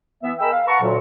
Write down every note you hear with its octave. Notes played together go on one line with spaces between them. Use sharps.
E3 B3 E5
G#4 A#4 D#5 G5 B5 E6
F5
B4 F#5 A5 A#5 C#6
D2 A#2 F#3